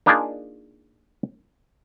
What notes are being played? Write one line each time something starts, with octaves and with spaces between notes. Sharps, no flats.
A#3 D4 D#4 F4 G#4 A#4